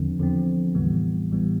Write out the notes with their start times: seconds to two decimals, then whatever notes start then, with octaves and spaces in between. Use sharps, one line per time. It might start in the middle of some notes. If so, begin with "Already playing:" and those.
Already playing: E2 D3 F3 C4
0.19 E2 D3 F3 C4
0.75 A1 A2 E3 G3 B3
1.30 A1 A2 E3 G3 B3